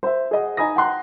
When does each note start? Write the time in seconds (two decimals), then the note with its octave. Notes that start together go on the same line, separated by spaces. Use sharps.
0.03 C5 E5
0.31 G#4 D#5 F#5
0.57 D#4 G#5 A#5 B5 D#6 A#6
0.76 F#5 G5 A5 A#5 C6 F#6